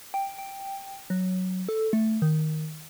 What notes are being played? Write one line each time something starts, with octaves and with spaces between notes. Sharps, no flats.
G5
G5
F#3
A4
A3
D#3